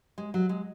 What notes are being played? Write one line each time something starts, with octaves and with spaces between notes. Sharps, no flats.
G#3
F#3
G#3